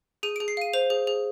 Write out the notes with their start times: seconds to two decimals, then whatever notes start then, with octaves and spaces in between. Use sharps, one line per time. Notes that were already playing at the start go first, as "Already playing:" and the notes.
0.23 G#4 D#7
0.36 G#4 D7
0.48 C7
0.57 F5 D#7
0.73 C5 F7
0.90 G#4
1.07 G#4